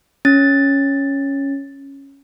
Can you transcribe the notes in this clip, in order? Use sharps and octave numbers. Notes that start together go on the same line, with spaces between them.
C#4 A6